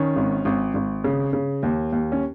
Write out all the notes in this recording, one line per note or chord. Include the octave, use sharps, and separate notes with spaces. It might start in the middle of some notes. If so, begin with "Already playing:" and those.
Already playing: D#3 C#4
G#1
G#1
G#1
C#3
C#3
D#2
D#2
C#4